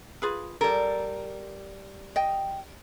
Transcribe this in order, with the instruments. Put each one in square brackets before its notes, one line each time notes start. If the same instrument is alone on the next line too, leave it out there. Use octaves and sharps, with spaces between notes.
[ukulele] F4 G#4 B4
[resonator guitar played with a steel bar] G3 A#4 [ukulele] A4
[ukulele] D#5 G5